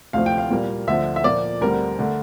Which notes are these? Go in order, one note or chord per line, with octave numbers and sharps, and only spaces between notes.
D2 C3 F3 A3 F5
G5
F5
A#2 G3 A#3
D2 D3 F3 E5
E5
A#2 F3 A#3 D5
D2 D3 G3 C4 A#4
D3 A3